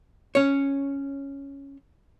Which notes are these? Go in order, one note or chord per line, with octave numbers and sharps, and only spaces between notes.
C#4 C#5